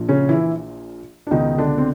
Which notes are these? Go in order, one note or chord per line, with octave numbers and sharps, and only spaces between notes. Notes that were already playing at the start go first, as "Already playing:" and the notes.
Already playing: A#1 A#2 F3
C#3 C#4
E3 E4
D4
C#2 B2 D#3 D#4
D3 D4
C4